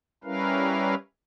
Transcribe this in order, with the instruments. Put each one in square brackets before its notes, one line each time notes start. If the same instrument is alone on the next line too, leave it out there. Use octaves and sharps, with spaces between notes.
[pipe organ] G3 C#4 E4 A#4 B4 F5